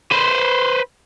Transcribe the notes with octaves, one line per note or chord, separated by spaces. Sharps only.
B4 C5